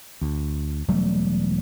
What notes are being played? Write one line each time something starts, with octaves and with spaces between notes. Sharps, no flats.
D2
E1 F#3 G3 A3